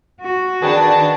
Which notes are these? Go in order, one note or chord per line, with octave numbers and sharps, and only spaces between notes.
F#4
D#3 D4 G#4 B4 G5 A5